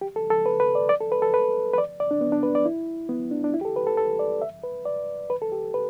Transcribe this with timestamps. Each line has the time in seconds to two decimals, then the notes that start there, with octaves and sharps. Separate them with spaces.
0.01 G4
0.16 A4
0.30 A4
0.46 B4
0.60 B4
0.75 D5
0.89 D5
1.00 A4
1.12 B4
1.22 A4
1.34 B4
1.73 B4
1.78 D5
2.00 D5
2.11 D4
2.21 B3
2.32 D4
2.43 B4
2.55 D5
2.65 E4
3.09 B3
3.31 D4
3.44 D4
3.54 E4
3.61 G4
3.65 A4
3.76 B4
3.87 A4
3.97 A4
4.19 D5
4.42 E5
4.64 B4
4.86 D5
5.30 B4
5.42 A4
5.52 G4
5.74 B4